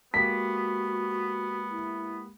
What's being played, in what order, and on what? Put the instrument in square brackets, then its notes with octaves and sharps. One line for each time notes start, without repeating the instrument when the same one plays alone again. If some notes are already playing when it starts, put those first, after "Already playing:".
[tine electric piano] G#3 A#3 G4 [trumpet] B3 [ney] F#4 [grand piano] B6
[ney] E4